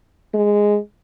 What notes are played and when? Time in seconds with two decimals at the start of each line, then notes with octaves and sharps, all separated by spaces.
0.34 G#3